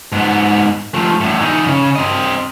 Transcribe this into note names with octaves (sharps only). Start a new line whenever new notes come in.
G#2 B3
F3 A3
E2 A2
E3 D#4
C#3
C4 D#5